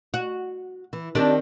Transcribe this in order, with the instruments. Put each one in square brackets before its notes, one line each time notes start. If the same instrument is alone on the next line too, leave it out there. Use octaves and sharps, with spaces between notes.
[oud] F#4
[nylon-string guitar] E3
[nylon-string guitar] D#3 C4 [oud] D4 G4 D5